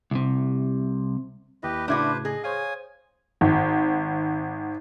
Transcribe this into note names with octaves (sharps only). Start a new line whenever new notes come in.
C2 C3
D#2 E4 G4 B4 D#5
A2 C#3 D4 E4 F#4 B4 C5 G#6
G#4 D#5
C5 C#5 F5 G#5 D#6
G#1